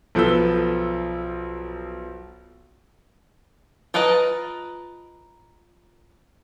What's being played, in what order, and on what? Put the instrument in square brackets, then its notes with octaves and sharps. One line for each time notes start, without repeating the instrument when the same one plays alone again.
[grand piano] B1 F3 A4 B4 E6 G7
[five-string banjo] F4 A#4 B4 D#5 A5